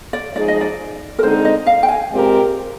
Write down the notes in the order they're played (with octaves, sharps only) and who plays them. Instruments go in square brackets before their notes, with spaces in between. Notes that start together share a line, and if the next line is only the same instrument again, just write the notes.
[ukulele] D5
[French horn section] F3 G#3 D#4 G#4 [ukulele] D5
[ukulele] D#5
D5
A#4
[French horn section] D3 G#3 C4 D#4 [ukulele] C5
[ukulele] D#5
F5
G5
G#5
[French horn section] A#2 G#3 C4 G4 A#4